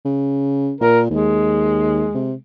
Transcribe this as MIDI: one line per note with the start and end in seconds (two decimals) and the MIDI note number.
0.05 0.74 49
0.81 1.06 46
0.81 1.00 70
1.10 2.08 39
1.10 2.39 56
2.15 2.34 48